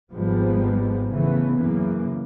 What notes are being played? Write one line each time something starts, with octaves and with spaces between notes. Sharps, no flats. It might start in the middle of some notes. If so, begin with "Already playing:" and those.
G#1 G#2 F3 G3 G#3 B3
C#3 E3 A3 B3
F#2 C#3 E3 A#3